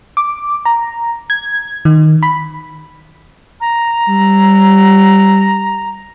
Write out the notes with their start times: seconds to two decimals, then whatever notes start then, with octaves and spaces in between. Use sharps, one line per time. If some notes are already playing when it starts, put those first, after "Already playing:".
0.17 D6
0.65 A#5
1.30 G#6
1.85 D#3
2.23 B5
3.61 A#5
4.08 G3